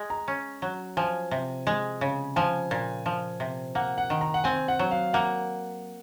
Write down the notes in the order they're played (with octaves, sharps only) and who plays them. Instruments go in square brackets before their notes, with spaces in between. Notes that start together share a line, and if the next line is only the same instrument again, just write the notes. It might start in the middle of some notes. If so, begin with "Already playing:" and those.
Already playing: [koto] G#3
[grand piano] A#5
[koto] C#4
F#3
[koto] F3 [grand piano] G#5
[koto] C3
G#3
C#3
[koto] F3 [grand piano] G#5
[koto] A#2
F3
C3
[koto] A#3 [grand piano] F#5
[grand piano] F#5
[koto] D#3
[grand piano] A#5
F#5
[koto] C4 [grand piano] G#5
[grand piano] F#5
[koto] F#3
[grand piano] F5
[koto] A#3 [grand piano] F#5